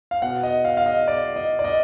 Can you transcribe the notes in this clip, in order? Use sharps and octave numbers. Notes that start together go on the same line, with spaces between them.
F5
B2 F#5
D#5
F5
F5
D#5
D5
D#5
D5
D#5